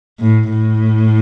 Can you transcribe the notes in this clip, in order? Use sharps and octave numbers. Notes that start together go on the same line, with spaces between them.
A2
A2